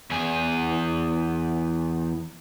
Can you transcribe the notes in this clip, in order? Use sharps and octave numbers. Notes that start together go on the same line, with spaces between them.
E2 G#4